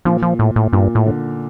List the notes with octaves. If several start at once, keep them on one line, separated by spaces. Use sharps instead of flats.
A#2 F3
F3
A2
A2
G2 A#2
A2
D3